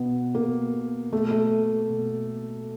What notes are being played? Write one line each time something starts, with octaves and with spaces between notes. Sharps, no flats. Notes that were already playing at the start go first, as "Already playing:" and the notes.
Already playing: B2 B3
B2 A#3
B2 A3
A3
B2